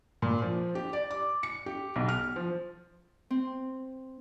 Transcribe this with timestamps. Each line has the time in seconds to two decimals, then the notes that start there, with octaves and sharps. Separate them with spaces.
0.22 A#2
0.42 F3
0.75 G4
0.93 D5
1.11 D6
1.43 C#7
1.66 G4
1.96 B1
2.08 F6
2.36 F3
3.31 C4